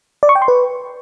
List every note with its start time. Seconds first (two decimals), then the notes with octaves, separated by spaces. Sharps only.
0.23 D5
0.29 C#6
0.35 G5
0.42 C6
0.48 B4